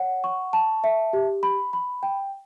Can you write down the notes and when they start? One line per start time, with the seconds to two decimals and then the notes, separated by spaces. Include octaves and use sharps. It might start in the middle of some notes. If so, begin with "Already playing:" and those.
Already playing: C#5 F#5
0.24 C#6
0.53 A5
0.84 E5
1.13 G4
1.43 B5
1.73 B5
2.03 G5